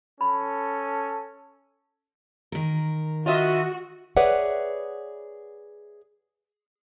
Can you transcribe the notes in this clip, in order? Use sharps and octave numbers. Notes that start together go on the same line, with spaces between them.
C#4 A4 B5
D#3 A#4
F4 F#4 D#5 E5
G#4 B4 C#5 D5 E5 F#5